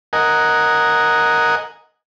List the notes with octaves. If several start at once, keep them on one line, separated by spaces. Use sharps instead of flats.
A#4 D#5 F#5 G#5